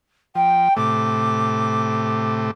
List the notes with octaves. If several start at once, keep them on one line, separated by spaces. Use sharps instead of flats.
F3 G5
A2 C3 A3 D6